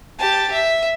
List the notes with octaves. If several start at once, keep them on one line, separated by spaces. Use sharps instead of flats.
G4 A5
E5